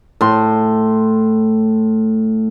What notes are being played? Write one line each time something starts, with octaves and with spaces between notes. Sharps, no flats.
A2 C6